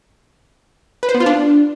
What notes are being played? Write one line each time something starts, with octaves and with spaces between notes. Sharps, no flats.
B4
C5
B3
F4
D4